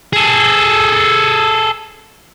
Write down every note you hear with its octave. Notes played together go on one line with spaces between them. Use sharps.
G#4 A4